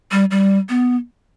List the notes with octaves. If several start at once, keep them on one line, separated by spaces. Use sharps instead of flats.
G3
G3
B3